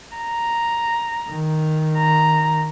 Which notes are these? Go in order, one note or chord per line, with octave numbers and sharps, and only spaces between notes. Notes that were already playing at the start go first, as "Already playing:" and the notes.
A#5
D#3
A#5